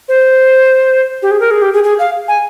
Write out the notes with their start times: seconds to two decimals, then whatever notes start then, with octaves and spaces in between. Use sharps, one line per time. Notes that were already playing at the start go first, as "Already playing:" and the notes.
0.08 C5
1.22 G4
1.31 G#4
1.40 A#4
1.51 G#4
1.62 G4
1.73 G#4
1.84 G#4
1.99 F5
2.28 G#5